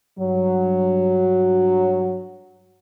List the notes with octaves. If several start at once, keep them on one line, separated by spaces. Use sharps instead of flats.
G2 F#3